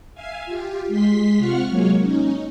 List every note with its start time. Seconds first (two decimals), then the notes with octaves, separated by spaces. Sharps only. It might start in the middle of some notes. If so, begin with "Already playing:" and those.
0.14 E5 F5 G#5
0.45 F4 G4
0.88 G#3 C6 B6
1.38 C3 F4 F#5 C#6 F6
1.70 F#3 G#3 A#3 C#5
2.00 C#4 D#4